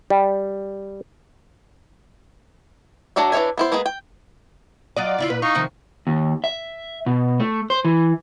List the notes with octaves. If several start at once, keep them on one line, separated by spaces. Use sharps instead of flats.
G3
F#3 D4 F#4 D5 E5
E3 D4 C#5 E5 G#5
B3 E4 C5
G#3 A#3 B3 G#4 B4
G5
F#3 F4 D5 D#5
C#3 E4 F4
A#2 B4
D#4 F4 C#6
C3 D#3 F3
D#2
E5
B2
A3
C5
E3